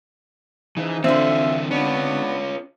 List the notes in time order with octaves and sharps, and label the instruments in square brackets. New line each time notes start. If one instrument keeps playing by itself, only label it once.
[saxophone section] C#3 F3 D#4 [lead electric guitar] E3
[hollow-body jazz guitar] D3 C4 [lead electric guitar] E3 D4 [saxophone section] F3 A4 E5
[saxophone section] B3 D4 [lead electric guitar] C#4 F4